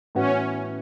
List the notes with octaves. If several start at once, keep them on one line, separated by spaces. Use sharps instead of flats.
A2 E3 B3 C#4 F#4